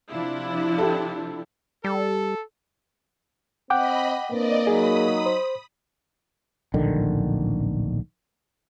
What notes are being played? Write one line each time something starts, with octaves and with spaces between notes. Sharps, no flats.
C3 F3 D4 E4 F4
G4 A4
G3 A4
C4 D#5 F#5 G5 B5 D6
A#3 C4 D4 B4 D5 D#5
F#3 D#4 G#4 B5 D#6
C5
D1 A#1 D3 D#3